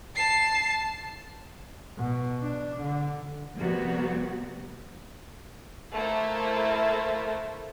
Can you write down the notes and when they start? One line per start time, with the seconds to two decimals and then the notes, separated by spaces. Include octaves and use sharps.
0.16 A5 C7
1.97 B2
2.43 D4
2.82 D3
3.56 F2 C3 G3 A#3 B3 F#4
5.94 A3 A#3 E4 C5 E5